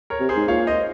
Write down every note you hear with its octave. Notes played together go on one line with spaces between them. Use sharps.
A#4 C#5
C3
G#4 C5
G#2
A#2 C#5 F5
C5 D#5